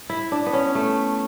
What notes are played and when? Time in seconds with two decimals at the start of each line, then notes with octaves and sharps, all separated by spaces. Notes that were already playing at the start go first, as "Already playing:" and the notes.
0.10 E4
0.32 D4
0.46 B3
0.53 C#4
0.75 A3